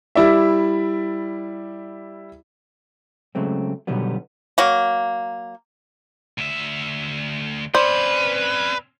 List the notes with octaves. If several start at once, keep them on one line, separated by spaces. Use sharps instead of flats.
G3 E4 D5 E5
C#3 F#3 G#3 A3 C4
B2 D3 D#3 F#3 G3 B3
F#3 A#3
D2 E5
C4 C#4 B4 C5 D5